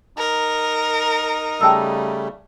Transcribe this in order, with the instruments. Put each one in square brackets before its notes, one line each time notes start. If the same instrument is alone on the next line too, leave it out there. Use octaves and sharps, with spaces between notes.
[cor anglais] D#4 [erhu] A#4
[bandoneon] C#3 G3 A3 [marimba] G5 A5 E6